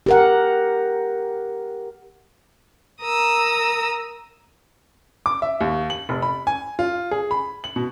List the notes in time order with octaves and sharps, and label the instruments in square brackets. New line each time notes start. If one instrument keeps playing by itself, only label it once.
[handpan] G4 A#4 F#5
[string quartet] A#4 A#5 D#6 E6
[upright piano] D6
E5
D#2
F#7
F1
B5
G#5
F4
G#4
B5
F#7
B2